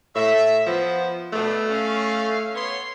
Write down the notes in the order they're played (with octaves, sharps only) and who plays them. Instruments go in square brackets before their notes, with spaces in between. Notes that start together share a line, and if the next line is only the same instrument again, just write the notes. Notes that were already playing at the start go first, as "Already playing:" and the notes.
[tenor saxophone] A2 [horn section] E5
[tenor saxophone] F3 [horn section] B3
[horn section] B2 B3 D4 [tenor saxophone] A3
[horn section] C#4 F5
B3 C#5 C6